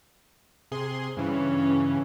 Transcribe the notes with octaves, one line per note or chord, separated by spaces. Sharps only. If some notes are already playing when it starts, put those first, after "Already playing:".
C3 G#4 C6
G2 C#3 E3 C#4